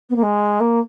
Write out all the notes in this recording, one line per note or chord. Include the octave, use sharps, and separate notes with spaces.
B3
A#3
G#3
A#3